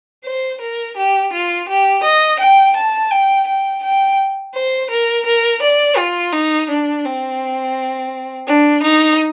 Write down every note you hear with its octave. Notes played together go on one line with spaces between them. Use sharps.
C5
A#4
G4
F4
G4
D#5
G5
A5
G5
G5
G5
C5
A#4
A#4
D5
F4
D#4
D4
C4
D4
D#4